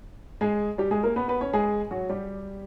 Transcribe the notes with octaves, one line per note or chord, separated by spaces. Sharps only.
G#3 G#4
G3 G4
G#3 G#4
A#3 A#4
B3 B4
B3 B4
C#4 C#5
G#3 G#4
F#3 F#4
G3 G4